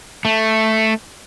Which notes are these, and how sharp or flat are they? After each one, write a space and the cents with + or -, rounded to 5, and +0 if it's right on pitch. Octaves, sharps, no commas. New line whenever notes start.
A3 +0